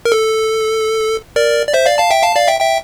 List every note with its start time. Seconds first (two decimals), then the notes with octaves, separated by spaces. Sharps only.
0.05 A#4
0.12 A4
1.36 A#4 D5
1.68 D5
1.73 C5 E5
1.86 D5 F5
1.98 F5 A5
2.10 E5 G5
2.23 F5 A5
2.36 D5 F5
2.48 E5 G5
2.60 E5 G5